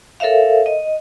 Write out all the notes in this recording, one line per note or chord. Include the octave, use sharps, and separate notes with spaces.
A4 A#4 C#5 E5 F5
D#5